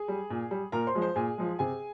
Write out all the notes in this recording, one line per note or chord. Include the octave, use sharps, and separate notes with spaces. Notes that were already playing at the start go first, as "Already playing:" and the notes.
Already playing: G#4 G#5
G3
A#2
G3
A#2 A#4 A#5
C5 C6
F3 G#3
C5 C6
A#2 G#4 G#5
F3 G#3
C3 G#4 G#5